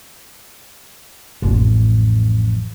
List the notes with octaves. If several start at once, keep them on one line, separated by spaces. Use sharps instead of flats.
A1 F2